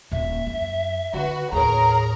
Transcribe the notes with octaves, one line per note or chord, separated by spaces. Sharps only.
D#1 A#2 E5
F#2
D3 F#4 B4
D#2 A2 G#4 A#4 C#5 A#5